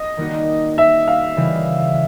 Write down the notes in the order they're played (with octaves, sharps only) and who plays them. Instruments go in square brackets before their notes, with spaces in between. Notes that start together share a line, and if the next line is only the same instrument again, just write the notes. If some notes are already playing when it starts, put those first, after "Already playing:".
Already playing: [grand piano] D#5
[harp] D#3 G3 A#3 D#4 F#4
[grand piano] E5
F5
[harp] C#3 E3 G3